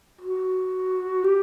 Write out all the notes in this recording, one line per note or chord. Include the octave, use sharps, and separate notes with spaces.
F#4
G4